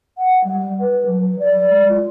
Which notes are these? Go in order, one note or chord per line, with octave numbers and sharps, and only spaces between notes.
F#5
G3
B4
F#3
D5
G#3
F4